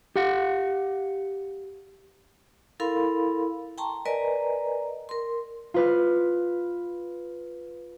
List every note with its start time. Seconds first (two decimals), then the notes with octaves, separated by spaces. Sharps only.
0.16 G4 F5 F#5
2.80 E4 A4 A#4 F5 B5 C6
3.78 G5 A5 A#5 C6 C#6
4.06 A#4 B4 D5 D#5 G#5 A#5
5.09 A#4 C6
5.74 F4 B4 F6